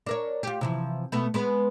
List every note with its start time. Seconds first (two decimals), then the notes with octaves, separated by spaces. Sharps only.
0.06 D4 A#4 C#5
0.43 F4 G4
0.61 C3 E3 F3
1.12 B2 A3 B3
1.34 G#3 B3 B4